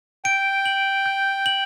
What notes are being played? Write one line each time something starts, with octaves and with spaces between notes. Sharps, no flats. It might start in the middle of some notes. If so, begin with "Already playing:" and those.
G5 D7
F#7
G6
F#7